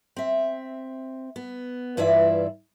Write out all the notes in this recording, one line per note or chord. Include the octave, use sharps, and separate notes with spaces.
C4 E5
B3
G2 E3 E4 F4 D5 E5